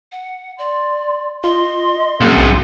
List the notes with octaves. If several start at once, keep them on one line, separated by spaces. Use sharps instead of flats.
F#5
D5 C6
F4 D#5 C6
C2 F#2 A#3 G#4
B1